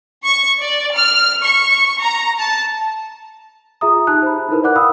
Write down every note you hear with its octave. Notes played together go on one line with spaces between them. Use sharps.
C#6
D5
F6
C#6
A#5
A5
F4 G#4 E5 A#5 D#6
D#4 G4 E5 A5 F#6
C5 B5
D#4 E4 A#4 B4
D5 F#5 D6 F#6
F5 G5 B5 D#6 E6